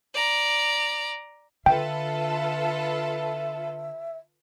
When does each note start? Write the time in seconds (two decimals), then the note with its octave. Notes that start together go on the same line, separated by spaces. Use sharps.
0.13 D5 A#5
1.66 D3 F4 A4 B4 E5 G5